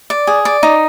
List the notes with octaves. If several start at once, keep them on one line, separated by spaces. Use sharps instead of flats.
D5
G#4
D5
D#4